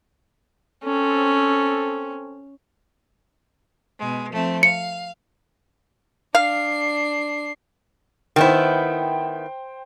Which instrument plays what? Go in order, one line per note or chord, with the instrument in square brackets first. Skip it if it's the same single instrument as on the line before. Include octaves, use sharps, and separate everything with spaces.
[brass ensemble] C4 A4 [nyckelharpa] C#4
[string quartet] B2 G#3
F3 A3 C4
[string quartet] F5 [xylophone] C#7
[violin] D4 C7 [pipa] F5
[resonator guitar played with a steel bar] D#3 B3 E4 [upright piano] C5 G5